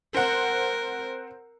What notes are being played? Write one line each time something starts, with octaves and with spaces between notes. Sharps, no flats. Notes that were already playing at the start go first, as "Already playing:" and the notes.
C4 A#4 F#5